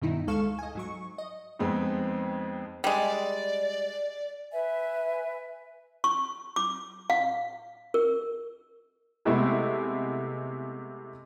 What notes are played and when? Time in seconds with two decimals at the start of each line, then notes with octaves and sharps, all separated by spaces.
0.02 G2 B2 D#3 D#4 E4
0.27 D2 G#3 A4 F5 C#6 E7
0.59 D#5 G#5
0.75 G#2 F#3 C#6
1.18 D#5
1.59 F2 G#3 B3 C4 D#4
2.84 G3 G#3 D5
4.53 B4 E5 G#5
6.04 C#6
6.56 D6
7.10 F5
7.94 A#4
9.25 C3 G#3 A3 B3 E4